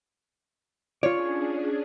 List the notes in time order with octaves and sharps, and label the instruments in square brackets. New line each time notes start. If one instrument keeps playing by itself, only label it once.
[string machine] C#4 D4 G#4 [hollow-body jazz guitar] F4 D5 [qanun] C#5